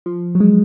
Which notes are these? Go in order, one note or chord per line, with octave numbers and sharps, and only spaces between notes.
F3
F#3
G#3